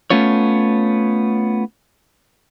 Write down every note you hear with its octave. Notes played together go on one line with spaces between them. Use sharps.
A3 B3 C#4 F4 C#5